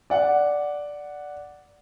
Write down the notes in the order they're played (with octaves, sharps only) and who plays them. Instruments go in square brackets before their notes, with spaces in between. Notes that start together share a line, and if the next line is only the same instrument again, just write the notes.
[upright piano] D5 F#5